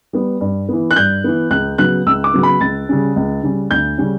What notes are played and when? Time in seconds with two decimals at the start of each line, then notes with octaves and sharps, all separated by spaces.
0.13 G3 B3
0.41 G2
0.69 E3 B3
0.91 F#6
0.96 G2 G6
1.24 E3 B3
1.50 C#2 F#6
1.78 C#3 F#3 B3 F#6
2.06 C#2 E6
2.24 D6
2.34 C#3 F#3 B3
2.43 B5
2.61 C#2 A6
2.89 C#3 G3 C#4
3.16 C#2
3.43 C#3 G3 C#4
3.71 D2 G6
3.98 C#3 G3 C#4